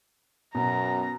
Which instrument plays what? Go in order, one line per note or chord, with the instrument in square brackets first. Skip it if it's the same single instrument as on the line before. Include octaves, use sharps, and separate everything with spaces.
[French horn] F#2 [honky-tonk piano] B2 [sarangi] A#5